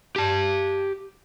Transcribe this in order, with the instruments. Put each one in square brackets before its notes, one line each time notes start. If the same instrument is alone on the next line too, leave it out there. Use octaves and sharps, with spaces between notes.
[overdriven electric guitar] G4 A5